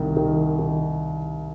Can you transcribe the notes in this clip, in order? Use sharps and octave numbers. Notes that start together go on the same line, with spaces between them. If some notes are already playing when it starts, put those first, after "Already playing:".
Already playing: C2 D#3
D#3
D#3